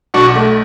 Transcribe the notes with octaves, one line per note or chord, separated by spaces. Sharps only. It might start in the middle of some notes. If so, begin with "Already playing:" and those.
B1 D4 F#4
A3